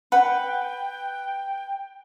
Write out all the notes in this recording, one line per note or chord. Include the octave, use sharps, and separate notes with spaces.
B4 F#5 G5